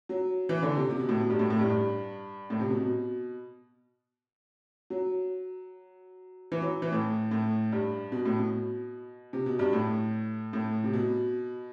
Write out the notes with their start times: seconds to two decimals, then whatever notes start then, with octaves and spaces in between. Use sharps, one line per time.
0.09 F#3
0.49 E3
0.63 D3
0.75 C3
0.90 C3
1.00 B2
1.09 A2
1.20 B2
1.30 G2
1.39 A2
1.50 A2
1.59 G2
1.70 G2
2.50 A2
2.60 C3
2.70 B2
2.81 B2
4.90 F#3
6.52 E3
6.61 F#3
6.82 E3
6.92 A2
7.31 A2
7.72 G2
8.12 B2
8.25 A2
8.39 B2
9.33 C3
9.46 B2
9.59 G2
9.73 A2
10.53 A2
10.84 C3
10.93 B2